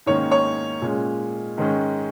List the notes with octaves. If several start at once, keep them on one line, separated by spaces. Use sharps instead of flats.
G#2 D#3 A#3 C#4 C#5
C#5
A#2 G#3 C#4
G#2 D#3 G#3 C#4